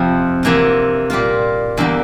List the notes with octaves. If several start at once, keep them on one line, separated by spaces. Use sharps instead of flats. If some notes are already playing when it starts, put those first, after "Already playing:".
Already playing: F2 C3 F3
C3 E3 A#3 F4
A#2 G3 A#3 F4
E2 D3 G3 A#3